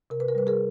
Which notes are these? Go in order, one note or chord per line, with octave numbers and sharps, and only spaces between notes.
C3 A#4
B4
A#4
G3 B4
G#4 A#4